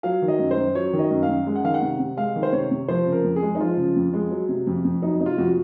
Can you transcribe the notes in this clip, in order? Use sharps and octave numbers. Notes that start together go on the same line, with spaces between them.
F#3 F5
D#3
D#5
F#2
C5
F#2
F#3 C#5
D#3
D#5
F#2
F5
F#2
G#3
F#5
D#3 F5
F#5
C3
C3
G#3 F5
D#3
C5
C3 C#5
C3
F3 C5
C#3
A#4
F2
G#4
G#3
D#4
F3 F4
C#3
F2
G#3
F#3
C3
F2
F2
F#3 D#4
C3 D#4
F4
F2 F#4